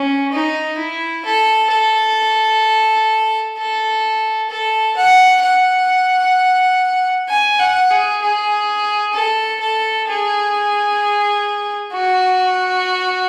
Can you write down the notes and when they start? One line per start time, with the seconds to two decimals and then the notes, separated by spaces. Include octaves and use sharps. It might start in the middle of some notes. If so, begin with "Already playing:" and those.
Already playing: C#4
0.32 D#4
0.78 E4
1.25 A4
1.71 A4
3.57 A4
4.50 A4
4.96 F#5
5.43 F#5
7.29 G#5
7.59 F#5
7.90 G#4
8.21 G#4
9.14 A4
9.60 A4
10.08 G#4
11.93 F#4